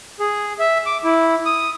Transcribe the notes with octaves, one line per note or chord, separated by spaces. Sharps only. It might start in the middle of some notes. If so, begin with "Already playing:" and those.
G#4
E5
D6
E4
D#6